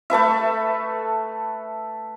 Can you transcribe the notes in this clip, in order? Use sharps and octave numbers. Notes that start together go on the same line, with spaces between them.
A3 A4 B4 E5